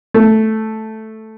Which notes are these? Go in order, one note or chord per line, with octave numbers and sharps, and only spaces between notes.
A3